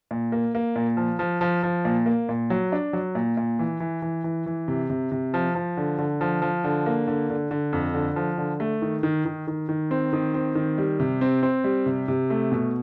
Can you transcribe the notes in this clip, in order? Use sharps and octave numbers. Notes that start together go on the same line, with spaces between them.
A#2
A#3
A#3
A#2
F3
F3
F3
F3
A#2
A#3
A#2
F#3
D4
F#3
A#2
A#2
E3
E3
E3
E3
E3
C3
C3
C3
F3
F3
D3
D3
F3
F3
D3
A#3
D3
D3
D3
F2
D3
F3
D3
A3
D#3
D#3
D#3
D#3
D#3
C4
D#3
C4
D#3
G3
C3
C4
C4
G3
C3
C3
A3
B2